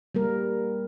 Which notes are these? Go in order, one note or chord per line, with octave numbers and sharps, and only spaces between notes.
G3 A#3 A#4